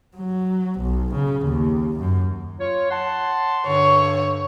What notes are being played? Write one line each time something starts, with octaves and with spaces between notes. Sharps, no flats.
F#3
B1
C#3
D#2
F#2
F4 C#5
F#5 A5 C6
G2 D3 C#5